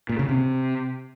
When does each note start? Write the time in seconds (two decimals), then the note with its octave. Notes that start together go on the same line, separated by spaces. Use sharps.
0.09 A#2
0.19 C#3
0.29 C3